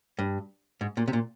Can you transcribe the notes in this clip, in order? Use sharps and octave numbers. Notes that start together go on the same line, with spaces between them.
G2
G#2
A#2
C3
A#2